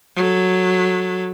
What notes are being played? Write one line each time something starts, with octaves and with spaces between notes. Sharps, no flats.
F#3 A4